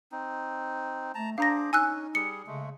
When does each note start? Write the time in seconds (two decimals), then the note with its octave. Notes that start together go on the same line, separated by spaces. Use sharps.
0.12 C4 D#4
1.15 A3 A5 A#5
1.38 D4 G#4 C5 F5 A#5 D6 A#6
1.73 C#4 D#4 G#5 E6 F#6
2.15 G3 G#4 C#7
2.47 C#3 G#3 A3